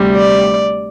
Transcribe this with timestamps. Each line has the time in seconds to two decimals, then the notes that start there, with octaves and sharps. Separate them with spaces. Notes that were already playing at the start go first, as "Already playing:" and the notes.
Already playing: D2 C3 G3
0.16 D5